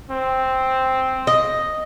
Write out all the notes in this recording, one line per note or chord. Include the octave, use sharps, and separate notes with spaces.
C4
D#5